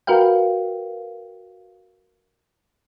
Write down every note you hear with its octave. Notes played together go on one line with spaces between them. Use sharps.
F#4 A#4 B4 F5 G5